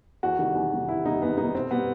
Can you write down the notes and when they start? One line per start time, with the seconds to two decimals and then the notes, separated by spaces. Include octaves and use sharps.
0.23 E2 F#4
0.39 C3 D#3 G3
0.55 E2
0.73 C3 D#3 G3
0.88 E2 E4
1.05 C3 D#3 G3 D#4
1.22 E2 B3
1.38 C3 D#3 G3 D#4
1.55 B2 C4
1.71 G3 B3